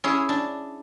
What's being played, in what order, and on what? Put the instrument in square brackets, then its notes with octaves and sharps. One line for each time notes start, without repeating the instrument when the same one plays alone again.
[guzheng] C#4 E4 G#4
D4